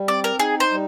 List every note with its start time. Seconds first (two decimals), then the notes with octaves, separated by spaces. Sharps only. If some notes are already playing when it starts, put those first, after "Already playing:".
Already playing: G3
0.08 C4 D5
0.24 A#4
0.39 D#4 G#4
0.60 C5
0.71 G3